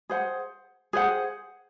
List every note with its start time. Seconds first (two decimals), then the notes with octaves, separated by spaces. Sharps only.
0.09 G#4 C5 F#5
0.93 G#4 C5 F#5